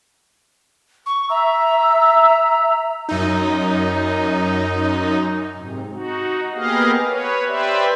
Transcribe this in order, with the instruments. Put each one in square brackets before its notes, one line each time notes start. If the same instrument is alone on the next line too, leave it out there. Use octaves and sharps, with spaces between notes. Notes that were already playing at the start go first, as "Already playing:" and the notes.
[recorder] C#6
[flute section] E5 E6 [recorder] A#5
[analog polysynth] F#2 D#4
[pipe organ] G#2 C3
D#4 F#4
A#3 B3 G4 G#4 D#5 F5
B4 C#5
G4 B4 C5 D5 E5